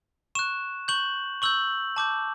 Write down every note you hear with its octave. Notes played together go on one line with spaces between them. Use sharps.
C#6 F#6 E7
C#6 G6 F#7
C#6 E6 G6 F#7
A5 D6 G6